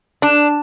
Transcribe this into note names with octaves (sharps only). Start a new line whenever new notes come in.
D4